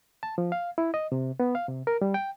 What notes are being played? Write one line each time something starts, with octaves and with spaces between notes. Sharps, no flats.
A5
F3
F5
E4
D#5
C3
B3
F5
C3
A#4
G3
G5